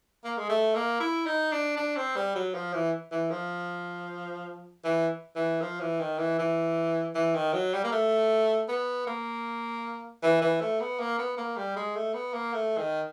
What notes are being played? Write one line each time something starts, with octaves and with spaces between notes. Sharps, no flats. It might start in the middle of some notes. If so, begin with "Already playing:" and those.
A#3
G#3
A3
A#3
E4
D#4
D4
D4
C4
G3
F#3
F3
E3
E3
F3
E3
E3
F3
E3
D#3
E3
E3
E3
D#3
F#3
G3
A#3
A3
B3
A#3
E3
E3
A3
B3
A#3
B3
A#3
G3
G#3
A3
B3
A#3
A3
D#3